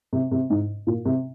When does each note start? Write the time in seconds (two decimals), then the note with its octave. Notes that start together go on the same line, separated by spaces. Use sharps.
0.13 C3
0.31 C3
0.50 G#2
0.87 A#2
1.05 C3